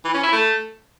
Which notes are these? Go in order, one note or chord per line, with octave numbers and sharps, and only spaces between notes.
E3
C#4
E4
A3